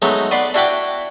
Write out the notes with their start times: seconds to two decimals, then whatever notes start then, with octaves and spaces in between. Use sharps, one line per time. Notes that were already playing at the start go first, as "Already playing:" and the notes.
0.02 F#3 G#3 A3 B3 D#4
0.31 B3 B4 D5 C6
0.54 D4 E4 F#4 G5 B5 D6